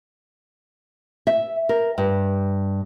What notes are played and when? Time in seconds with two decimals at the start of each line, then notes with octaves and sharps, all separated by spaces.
1.27 E5
1.69 A#4
1.98 G2